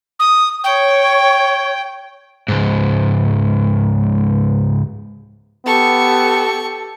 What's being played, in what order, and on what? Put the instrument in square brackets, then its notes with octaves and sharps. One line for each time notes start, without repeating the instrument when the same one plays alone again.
[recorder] D#6
[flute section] C#5 C#6 [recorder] G5
[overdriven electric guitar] C#2 G#2
[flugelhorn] B3 [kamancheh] G4 A4 [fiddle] C#6